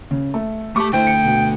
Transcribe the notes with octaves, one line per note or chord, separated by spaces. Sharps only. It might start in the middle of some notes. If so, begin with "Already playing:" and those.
C#3
A3
A3 G4 A5 C#6 D6
D3 A3 E4 C5 E5 G5
C#7
B2